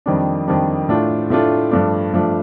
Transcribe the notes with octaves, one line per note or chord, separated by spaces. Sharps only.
F2 D#3 G3 D4
F2 D#3 G3 D4
A2 A3 D4 F4
A2 A3 D4 F4
G2 F3 A3 D4
G2 F3 A3 D4